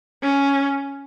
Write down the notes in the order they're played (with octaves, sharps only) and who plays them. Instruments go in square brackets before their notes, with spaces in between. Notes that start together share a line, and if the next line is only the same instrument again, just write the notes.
[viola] C#4